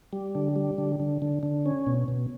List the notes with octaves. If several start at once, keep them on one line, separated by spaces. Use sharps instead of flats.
G3
D3
G3
D3
D3
D3
D3
C#4
B2
B2